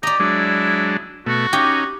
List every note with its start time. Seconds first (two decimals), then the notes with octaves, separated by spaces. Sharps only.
0.03 G4 D5 D#5 A#5
0.20 F#3 G#3 D4 E4
1.26 B2 A3 F#4
1.53 C#4 D#4 G4